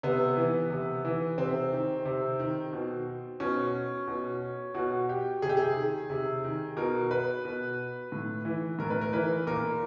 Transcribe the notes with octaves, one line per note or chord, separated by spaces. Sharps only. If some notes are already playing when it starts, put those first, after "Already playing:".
C3 B3
E3
C3
E3
C3 C4
D#3
C3
D#3
B2
B2 C#4
B2
B2 F#4
G4
C3 G#4
G4
G#4
D#3
C3
D#3
B2 A#4
B4
B2
A2
E3
A2 A#4
B4
A#4
E3 B4
A#2 A#4